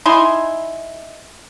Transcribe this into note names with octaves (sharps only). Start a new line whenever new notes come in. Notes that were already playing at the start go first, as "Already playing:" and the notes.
D#4 E4 G#5 C6